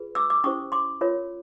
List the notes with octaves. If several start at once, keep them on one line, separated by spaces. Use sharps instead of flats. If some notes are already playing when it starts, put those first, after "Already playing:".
Already playing: F4 G#4 B4
D6 E6
D6 E6
C#4 E4 G4 C5 C#6 D#6
C6 D6
F4 A#4 C#5